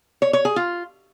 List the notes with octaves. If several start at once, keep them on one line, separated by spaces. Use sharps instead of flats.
C#5
C#5
G#4
F4